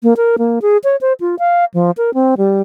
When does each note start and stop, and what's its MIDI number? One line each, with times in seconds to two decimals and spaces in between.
0.03 0.14 58
0.17 0.36 70
0.38 0.59 58
0.62 0.77 68
0.84 0.96 73
1.01 1.13 72
1.20 1.35 65
1.39 1.65 77
1.74 1.91 53
1.97 2.14 70
2.14 2.35 60
2.38 2.62 55